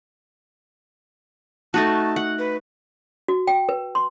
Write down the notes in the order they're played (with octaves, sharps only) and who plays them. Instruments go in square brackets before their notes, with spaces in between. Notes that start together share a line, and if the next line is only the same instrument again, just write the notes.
[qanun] A3 D#4 F#4 [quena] A5
[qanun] F#5
[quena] B4
[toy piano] F#4
G5
B4
C6